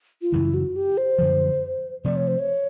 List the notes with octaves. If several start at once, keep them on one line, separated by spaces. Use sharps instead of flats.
F4
F#2 C#3 E3 G3 E4
F#4
G4
C5
F#2 D3 F3
C3 F3 A3 D5
C#5
C5
C#5